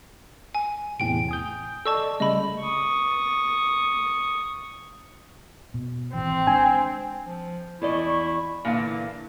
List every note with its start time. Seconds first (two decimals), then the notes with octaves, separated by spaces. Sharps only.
0.55 G#5
1.00 E2 A2 C3 G5 D7
1.29 G#5 D#6 G6
1.85 A4 D5 D#5 A5 C#6 E6
2.20 C#3 G3 A3 D#5 B5
2.60 C#6 D#6
5.74 B2
6.14 G#1 E3 C4
6.47 G#3 D4 G#5
7.25 F3
7.82 E2 E4 D5 D#5 C#6
8.65 A#2 D3 E3 F5